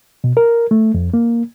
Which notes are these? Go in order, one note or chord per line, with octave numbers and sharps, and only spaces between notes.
B2
A#4
A3
F2
A#3